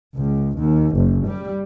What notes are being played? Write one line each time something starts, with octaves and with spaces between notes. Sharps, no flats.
C#2
D#2
F#1
G3